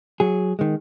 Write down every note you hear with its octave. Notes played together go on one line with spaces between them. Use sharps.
F#3 G#4
D#3 G#3